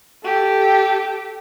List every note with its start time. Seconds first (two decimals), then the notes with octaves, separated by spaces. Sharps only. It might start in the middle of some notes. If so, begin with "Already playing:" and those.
0.23 G4 A4